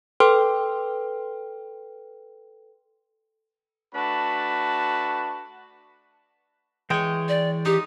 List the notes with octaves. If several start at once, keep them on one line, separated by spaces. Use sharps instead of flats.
A4 B4 G5 C6 F6
A3 D4 F#4 B4 A5 B5
E3 G#3 C#5 G5
D5
D#4 G4